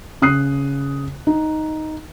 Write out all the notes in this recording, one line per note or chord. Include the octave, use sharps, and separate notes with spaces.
C#3 D#6 F#6 C7
D#4